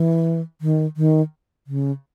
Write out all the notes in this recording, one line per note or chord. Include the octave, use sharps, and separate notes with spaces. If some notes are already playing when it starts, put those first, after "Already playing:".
Already playing: E3
D#3
D#3
C#3